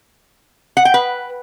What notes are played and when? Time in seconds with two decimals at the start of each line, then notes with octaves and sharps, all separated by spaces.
0.77 F#5
0.85 G5
0.94 B4